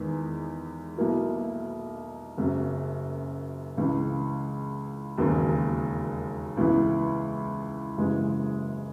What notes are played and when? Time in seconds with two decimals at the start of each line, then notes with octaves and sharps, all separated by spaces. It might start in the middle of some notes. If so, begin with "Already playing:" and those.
Already playing: E2 D#3 G#3
0.98 B1 B2 F#3 A#3 E4
2.37 F#1 F#2 C#3 F#3
3.77 C#2 C#3 E3
5.18 E1 D#2 C#3 F#3 A#3
6.57 C#2 C#3 E3 B3 E4
7.97 F#1 F#2 C#3 E3 G#3